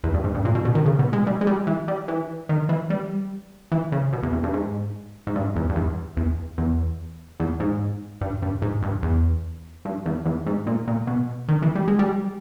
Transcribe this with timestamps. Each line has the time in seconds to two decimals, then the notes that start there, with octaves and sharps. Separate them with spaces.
0.04 E2
0.14 G2
0.24 G#2
0.35 G2
0.45 A#2
0.55 B2
0.65 B2
0.75 D#3
0.86 C#3
0.99 B2
1.13 G#3
1.27 G3
1.41 G#3
1.47 G3
1.67 E3
1.88 G3
2.08 E3
2.49 D#3
2.69 E3
2.90 G3
3.72 E3
3.92 C#3
4.13 B2
4.23 E2
4.33 E2
4.43 G2
4.54 G#2
5.27 G#2
5.35 G2
5.56 E2
5.70 G2
5.76 E2
6.17 E2
6.58 E2
7.40 E2
7.60 G#2
8.21 G2
8.42 G2
8.62 G#2
8.83 G2
9.03 E2
9.85 G2
10.06 E2
10.26 E2
10.46 G#2
10.67 A#2
10.88 A#2
11.07 B2
11.48 D#3
11.62 E3
11.75 G3
11.88 G#3
11.99 G3